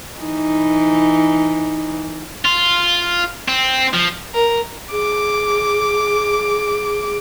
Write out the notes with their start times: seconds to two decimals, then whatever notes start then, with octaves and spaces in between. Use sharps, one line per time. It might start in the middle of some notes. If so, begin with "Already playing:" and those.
0.20 E3 D#4
2.45 F4
3.48 C4
3.94 F3
4.34 A#4
4.92 G#4 D6